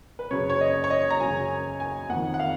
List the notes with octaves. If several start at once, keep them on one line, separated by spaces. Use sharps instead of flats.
B4
F#2 C#3 C#5
C#5
D#5
C#5
D#5
A#5
F#2 C#3 G#5
G#5
F2 D#3 F#5
F#5
F5